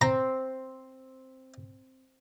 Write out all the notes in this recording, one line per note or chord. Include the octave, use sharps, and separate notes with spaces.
C4 A#5